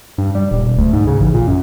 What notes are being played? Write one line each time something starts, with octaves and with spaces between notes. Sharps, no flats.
G2
G3
D#1
E1
D2
G#2
C#3
A1
A#2
F#2